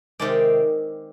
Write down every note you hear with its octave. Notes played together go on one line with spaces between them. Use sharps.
C3 D#3 G#3 D5